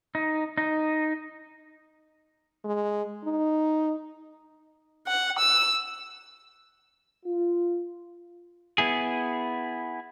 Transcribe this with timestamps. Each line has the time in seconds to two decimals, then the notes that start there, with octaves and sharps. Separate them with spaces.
0.15 D#4
0.58 D#4
2.65 G#3
3.25 D#4
5.07 F#5
5.39 E6
7.25 F4
8.78 B3 E4 G#4